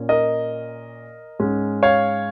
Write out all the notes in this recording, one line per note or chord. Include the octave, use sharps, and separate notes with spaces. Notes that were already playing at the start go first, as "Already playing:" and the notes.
Already playing: A#2 A#3 C#4
A#4 D#5
G#2 G#3 C#4
C#5 F5